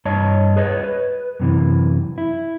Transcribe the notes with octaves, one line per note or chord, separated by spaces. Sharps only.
G2 C#5 D#5 A5
G#4 B4 C#5 D#5
B4
F#2 C3 E3
E4